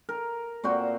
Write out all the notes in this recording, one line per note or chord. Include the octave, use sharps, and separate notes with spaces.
A#4
A#2 C4 F#4 C5